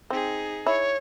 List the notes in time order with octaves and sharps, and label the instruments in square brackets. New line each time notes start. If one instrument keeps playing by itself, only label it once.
[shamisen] C4 [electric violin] D#4 G#4
[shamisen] E4 [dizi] C#5